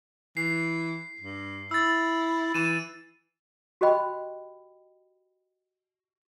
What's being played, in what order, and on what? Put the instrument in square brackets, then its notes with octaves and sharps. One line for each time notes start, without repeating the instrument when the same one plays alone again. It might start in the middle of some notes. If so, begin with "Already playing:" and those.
[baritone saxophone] E3 [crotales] C7
[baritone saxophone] G2
[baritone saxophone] E4 [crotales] E6 A6
[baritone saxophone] E3 [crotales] D#7 E7
[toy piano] F#4 G4 C5 D#5 G5 B5